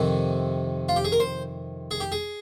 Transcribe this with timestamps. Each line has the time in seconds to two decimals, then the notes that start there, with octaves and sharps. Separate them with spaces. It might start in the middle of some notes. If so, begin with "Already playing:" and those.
Already playing: F2 C3 D#3
0.89 F4
0.96 G4
1.05 G#4
1.12 A#4
1.20 C5
1.91 G#4
2.00 G4
2.12 G#4